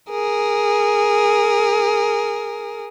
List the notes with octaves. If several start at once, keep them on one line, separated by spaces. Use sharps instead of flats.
G#4 A#4